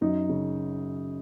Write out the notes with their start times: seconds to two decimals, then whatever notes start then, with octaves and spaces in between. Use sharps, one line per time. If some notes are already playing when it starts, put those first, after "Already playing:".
0.01 F#2 D#4
0.29 C#3